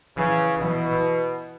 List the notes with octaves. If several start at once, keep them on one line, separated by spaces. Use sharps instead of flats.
C#3 E3
B2 E3